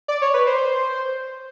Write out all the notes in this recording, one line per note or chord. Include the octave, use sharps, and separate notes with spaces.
D5
C#5
B4
C5